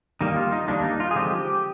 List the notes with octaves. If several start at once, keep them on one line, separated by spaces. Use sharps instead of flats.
D#3 G3 A#3 D#4
F4
D#4
D#3 G3 A#3 D4
D#4
F4
G#4
D3 F3 G#3 C4 G4